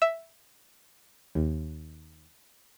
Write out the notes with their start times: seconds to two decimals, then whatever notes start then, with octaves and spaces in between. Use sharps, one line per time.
0.02 E5
1.35 D#2